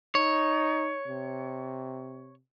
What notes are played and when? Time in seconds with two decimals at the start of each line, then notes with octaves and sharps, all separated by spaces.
0.15 D#4 C#5
1.07 C3